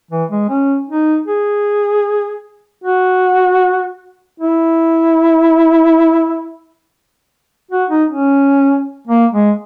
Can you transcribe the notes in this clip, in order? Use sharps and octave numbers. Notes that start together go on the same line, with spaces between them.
E3
G#3
C#4
D#4
G#4
F#4
E4
F#4
D#4
C#4
A#3
G#3